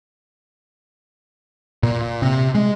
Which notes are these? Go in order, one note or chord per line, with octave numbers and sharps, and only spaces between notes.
A#2
C3
G#3